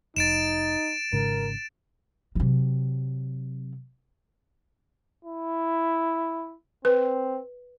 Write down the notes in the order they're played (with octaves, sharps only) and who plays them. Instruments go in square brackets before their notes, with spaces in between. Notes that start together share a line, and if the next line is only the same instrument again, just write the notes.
[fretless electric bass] F1 [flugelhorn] D#4 [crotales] A6 D7 E7
[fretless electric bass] G#1 G#2 C#3 [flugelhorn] A#4
[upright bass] C3 F#3
[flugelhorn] E4
[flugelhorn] C4 [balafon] B4